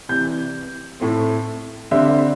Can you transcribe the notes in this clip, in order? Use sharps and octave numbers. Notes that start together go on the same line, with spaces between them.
C3 E3 G3 G6
A2 A3 C4
D3 G3 C4 E5